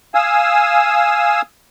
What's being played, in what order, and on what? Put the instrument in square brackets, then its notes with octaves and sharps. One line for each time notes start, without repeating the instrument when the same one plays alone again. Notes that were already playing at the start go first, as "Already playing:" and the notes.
[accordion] F5 G#5 D#6 E6